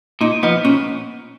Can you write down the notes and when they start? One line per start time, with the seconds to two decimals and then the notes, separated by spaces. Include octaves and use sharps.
0.21 A#2 D#4
0.43 F3 B3 D#4
0.64 A#2 C#4